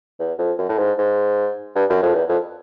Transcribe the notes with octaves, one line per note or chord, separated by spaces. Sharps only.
E2
F2
F#2
A2
G#2
G#2
G2
F#2
F2
E2
F2